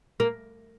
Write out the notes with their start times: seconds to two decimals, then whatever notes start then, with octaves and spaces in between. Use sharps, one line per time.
0.20 A#3